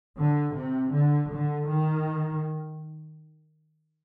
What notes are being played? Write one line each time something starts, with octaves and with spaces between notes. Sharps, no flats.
D3
C3
D3
D3
D#3